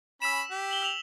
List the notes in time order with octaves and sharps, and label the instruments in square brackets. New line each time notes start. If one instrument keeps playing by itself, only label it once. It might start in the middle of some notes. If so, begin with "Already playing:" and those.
[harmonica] C#4 B5 [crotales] E6 B6 E7
[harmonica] G4
[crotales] F#7 G7
E6 F7 F#7